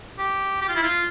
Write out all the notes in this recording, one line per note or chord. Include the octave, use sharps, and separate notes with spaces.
G4
G4
F4
E4
F4